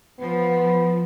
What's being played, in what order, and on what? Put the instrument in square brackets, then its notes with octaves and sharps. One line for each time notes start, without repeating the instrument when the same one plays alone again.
[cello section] F3 [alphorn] B3